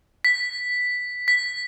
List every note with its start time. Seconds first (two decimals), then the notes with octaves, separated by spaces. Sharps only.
0.25 B6
1.28 B6